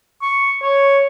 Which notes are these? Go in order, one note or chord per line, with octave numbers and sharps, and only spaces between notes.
C#6
C#5